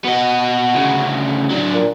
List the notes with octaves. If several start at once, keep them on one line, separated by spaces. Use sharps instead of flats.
B3 F#4 D#5
D2 C#3
F#3 D4
A#2